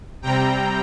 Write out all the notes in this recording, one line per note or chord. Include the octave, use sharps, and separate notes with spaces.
C3 G3 C4 G5 A#5